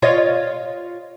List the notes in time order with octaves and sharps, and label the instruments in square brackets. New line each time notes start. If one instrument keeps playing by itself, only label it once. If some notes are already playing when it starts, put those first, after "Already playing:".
[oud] F4 C#5 D#5